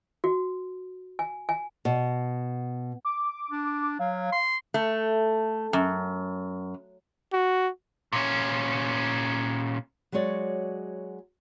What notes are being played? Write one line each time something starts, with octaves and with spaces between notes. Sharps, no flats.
F#4
G#5
G#5
B2
D6
D4
F#3 F5
C6
A3
F#2
F#4
A#2 C#4
F#3 G#3 F#4 C#5 D5